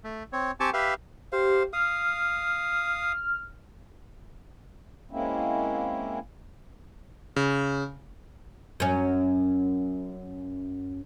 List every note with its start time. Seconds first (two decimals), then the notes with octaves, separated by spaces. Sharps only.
0.04 A3
0.33 C4 C#5
0.60 C4 G4 G#5 A5 C#6 D6
0.73 G4 B4 E5 F5
1.32 G4 C5 F5
1.73 F5 D#6 F6
5.11 G#3 A#3 C4 C#4 E4
7.36 C#3
8.80 F#2 C#4